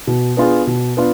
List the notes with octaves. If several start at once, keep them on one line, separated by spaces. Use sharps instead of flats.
B2
B3 D4 F4 G#4
B2
B3 D4 F4